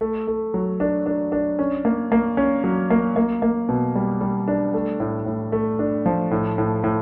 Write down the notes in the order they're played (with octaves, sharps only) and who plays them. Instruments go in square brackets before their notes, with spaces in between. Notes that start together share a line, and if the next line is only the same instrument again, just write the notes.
[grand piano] A3
A3
F#3
D4
D4
D4
C#4
A#3
A#3
C#4
F#3
A#3
A#3
A#3
B2
G3
G3
D4
A3
A2
A2
A3
D4
F3
A2
A2
A2